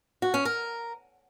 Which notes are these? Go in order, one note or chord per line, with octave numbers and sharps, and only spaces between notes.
F#4
C#4
A#4